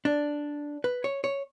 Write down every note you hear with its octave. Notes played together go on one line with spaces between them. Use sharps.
D4
B4
C#5
C#5